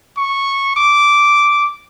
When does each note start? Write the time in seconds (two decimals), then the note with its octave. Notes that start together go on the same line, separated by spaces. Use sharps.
0.17 C#6
0.77 D6